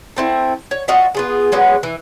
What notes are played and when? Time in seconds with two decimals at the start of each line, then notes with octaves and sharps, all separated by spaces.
0.17 A3 C4 E4
0.71 C#5
0.88 F4 F#4 D#5 E5
1.15 B3 F4 G#4
1.52 F#3 G#3 B3 C#4
1.83 E3